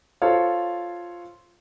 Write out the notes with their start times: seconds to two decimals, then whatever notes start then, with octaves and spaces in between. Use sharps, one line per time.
0.22 F4 A4 C5 C#5 F5